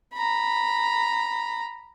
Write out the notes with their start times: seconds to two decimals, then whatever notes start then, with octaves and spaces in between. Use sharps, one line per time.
0.14 A#5 B5